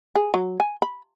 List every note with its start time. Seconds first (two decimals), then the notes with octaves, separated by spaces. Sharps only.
0.15 G#4
0.34 F#3
0.60 G#5
0.82 B5